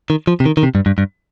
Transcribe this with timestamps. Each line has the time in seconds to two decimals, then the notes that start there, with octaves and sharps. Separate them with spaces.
0.10 D#3
0.27 F3
0.40 C3
0.46 D#3
0.57 D#3
0.63 C3
0.75 G2
0.86 G2
0.98 G2